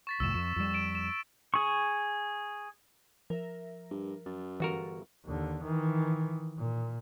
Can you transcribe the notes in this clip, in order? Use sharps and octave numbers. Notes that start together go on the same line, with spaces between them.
C#6 A6 B6
C2 F2 A2 E6 E7
F2 C#6
F2 G3
D7 E7
E7
G#4 C#6
F3 A#4 E5
G2
F#2 A6
G1 E3 F#4 A#4
D#2 D3
D#3 E3
A#2